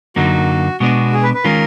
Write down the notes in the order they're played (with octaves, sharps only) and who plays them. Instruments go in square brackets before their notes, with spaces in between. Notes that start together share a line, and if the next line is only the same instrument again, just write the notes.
[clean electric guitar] F#2 D3 F#3 A#3 D#4 [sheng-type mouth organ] F#4
[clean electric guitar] B2 G#3 B3 D4 [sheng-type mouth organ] F#4
[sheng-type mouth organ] G#4
B4
B4
[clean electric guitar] D#3 G#3 C#4 F4 [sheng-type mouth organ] A#4